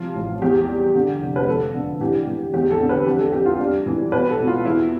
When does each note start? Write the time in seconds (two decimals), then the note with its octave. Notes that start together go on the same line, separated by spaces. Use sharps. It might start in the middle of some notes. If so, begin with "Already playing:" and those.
Already playing: C3 F3 F4
0.15 A1
0.41 E2 G4
0.68 G3
0.94 D3
1.21 F1
1.36 B4
1.48 F3 A4
1.74 D3
2.00 E3 G4
2.27 E3
2.53 E2 G4
2.71 A4
2.79 D3
2.89 B4
3.07 F2 G4
3.19 A4
3.33 F2 G4
3.46 F4
3.59 G3 D4
3.86 E3
4.12 B2 B4
4.30 A4
4.39 B2
4.47 F4
4.65 E2 E4